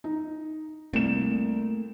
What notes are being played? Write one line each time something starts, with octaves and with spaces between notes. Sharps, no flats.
D#4
C2 A3 A#3 E7